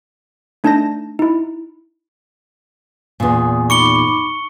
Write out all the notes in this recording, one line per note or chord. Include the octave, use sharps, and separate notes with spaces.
A3 D4 D#4 A5 G6 A#6
D#4 E4
E2 A#2 G#5 D#6
D#4 B5 C#6 D6 C#7 G7